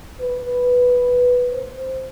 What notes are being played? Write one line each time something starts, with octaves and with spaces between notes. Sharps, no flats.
B4
C5